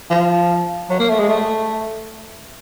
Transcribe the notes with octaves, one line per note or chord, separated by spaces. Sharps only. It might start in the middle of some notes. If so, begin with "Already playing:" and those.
F3
F#3
A#3
A3
G#3
A3